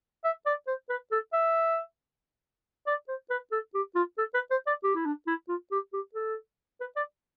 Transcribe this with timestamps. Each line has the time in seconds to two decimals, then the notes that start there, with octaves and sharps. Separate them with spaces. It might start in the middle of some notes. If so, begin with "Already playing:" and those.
0.24 E5
0.46 D5
0.67 C5
0.90 B4
1.12 A4
1.33 E5
2.87 D5
3.08 C5
3.30 B4
3.52 A4
3.74 G4
3.95 F4
4.18 A4
4.34 B4
4.51 C5
4.67 D5
4.84 G4
4.95 E4
5.06 D4
5.27 E4
5.49 F4
5.72 G4
5.93 G4
6.15 A4
6.81 B4
6.96 D5